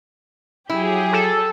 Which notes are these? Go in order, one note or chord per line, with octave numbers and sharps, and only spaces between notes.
F#3 E4 G4 G#4
A4